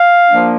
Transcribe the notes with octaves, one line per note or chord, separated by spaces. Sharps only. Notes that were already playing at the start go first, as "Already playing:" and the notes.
Already playing: F5
F3 A#3 D4